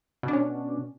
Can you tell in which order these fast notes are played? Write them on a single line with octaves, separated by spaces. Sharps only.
B2 D4 C#4